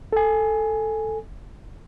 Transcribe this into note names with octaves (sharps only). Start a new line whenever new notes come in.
A4 G#5